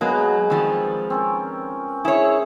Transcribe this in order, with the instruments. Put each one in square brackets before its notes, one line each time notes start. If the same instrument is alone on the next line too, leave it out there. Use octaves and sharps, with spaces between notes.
[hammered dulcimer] B2 G#3 B3 [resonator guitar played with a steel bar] F#3 A#3
[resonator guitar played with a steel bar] D#3 F3 G3 [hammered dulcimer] C4
[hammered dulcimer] C4 C#4 A#4
[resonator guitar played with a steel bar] E4 C#5 [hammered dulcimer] G#4